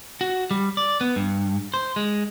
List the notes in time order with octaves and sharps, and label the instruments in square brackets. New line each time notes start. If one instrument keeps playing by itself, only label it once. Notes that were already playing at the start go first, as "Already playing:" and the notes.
[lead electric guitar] F#4
G3
D5
B3
G2
C5
G#3